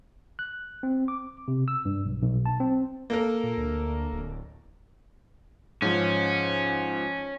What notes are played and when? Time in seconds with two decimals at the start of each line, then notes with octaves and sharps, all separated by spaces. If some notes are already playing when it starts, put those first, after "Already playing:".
0.39 F#6
0.83 C4
1.08 D6
1.48 C3
1.68 E6
1.85 G2
2.06 B1
2.22 B1
2.46 A5
2.60 C4
3.10 A#3 A4 A#4
3.44 A#2
3.58 D2
4.13 D1
5.82 G#2 F3 C#4